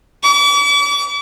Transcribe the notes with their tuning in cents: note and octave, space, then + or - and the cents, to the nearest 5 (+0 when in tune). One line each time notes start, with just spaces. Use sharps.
D6 -45